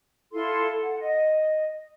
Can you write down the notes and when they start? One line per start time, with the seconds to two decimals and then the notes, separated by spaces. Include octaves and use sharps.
0.32 E4 F4 A4 C6
0.83 F#5
0.99 D#5